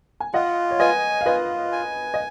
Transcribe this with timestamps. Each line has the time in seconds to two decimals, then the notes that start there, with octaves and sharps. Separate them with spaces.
0.20 G#5
0.34 F4 D#5 F#5
0.71 C#5
0.80 B4 D#5 G#5
1.21 F5
1.26 F4 B4 D#5
1.72 G#5
2.14 D#5